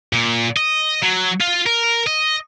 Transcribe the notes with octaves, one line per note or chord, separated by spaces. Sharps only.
A#2
D#5
F#3
F4
A#4
D#5